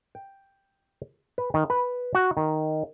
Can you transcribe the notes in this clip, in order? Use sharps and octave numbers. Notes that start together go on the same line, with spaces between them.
G5
B4
D#3
B4
F#4
D#3